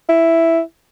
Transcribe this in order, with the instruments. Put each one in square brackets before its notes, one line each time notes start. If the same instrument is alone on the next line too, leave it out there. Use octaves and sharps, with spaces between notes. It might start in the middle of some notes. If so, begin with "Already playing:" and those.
[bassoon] E4